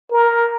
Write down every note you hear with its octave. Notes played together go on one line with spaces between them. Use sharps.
A#4